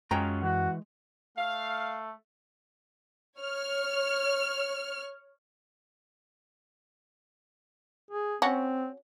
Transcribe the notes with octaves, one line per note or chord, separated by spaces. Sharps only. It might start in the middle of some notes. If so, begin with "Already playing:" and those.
F#2 G#3 C#4 F4 F#4 G5 A#5
E3 F#4
A3 F5
C#5 F6
G#4
C4 C#4 F#4